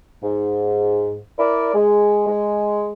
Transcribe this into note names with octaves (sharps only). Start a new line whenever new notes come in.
G#2
E4 A#4 D5
G#3
G#3